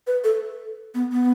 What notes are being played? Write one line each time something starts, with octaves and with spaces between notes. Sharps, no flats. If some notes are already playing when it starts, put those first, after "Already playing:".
B4
A4
B3
B3